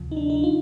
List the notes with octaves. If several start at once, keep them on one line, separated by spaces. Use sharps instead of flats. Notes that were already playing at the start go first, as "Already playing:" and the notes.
Already playing: D2 C3 F3
D#4
D4
D#4
F4